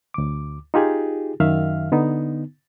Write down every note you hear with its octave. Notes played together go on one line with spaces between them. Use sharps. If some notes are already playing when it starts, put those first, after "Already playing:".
D2 D6
D#4 F4 G4 G#4
F#2 D#3 E5 F5 F6
D3 B3 D#4